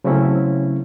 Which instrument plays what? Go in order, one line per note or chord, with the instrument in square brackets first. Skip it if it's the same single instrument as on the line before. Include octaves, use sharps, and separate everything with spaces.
[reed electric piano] C#3 F#3 A3 C4 C#4 E4